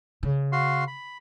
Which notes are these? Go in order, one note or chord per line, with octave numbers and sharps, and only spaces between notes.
C#3
F#4 F5 C6
B5